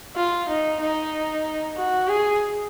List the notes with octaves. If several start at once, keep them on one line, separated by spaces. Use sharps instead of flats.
F4
D#4
D#4
F#4
G#4